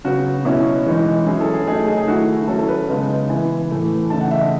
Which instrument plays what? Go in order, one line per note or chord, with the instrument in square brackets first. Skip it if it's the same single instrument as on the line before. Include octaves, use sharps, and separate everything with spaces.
[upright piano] C#3 F#3 B3 F#4
B2 F#3 C#4 E4
E3 G#3 D#4
F#3 C#4 E4 G#4
A4
G#4
F#3 A3 D#4 G#4
G#4
G#4
D#3 A3 E4 F#4
F#3 C#4 E4 A4
A4
B4
C#3 G#3 B3 D#4
E3 B3 E4 G#5
A2 E3 A3
C#3 E3 A3 D#4 A5
F#5
E5
D#5